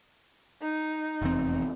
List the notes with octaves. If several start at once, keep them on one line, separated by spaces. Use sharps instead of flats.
D#4
F1 E2 C4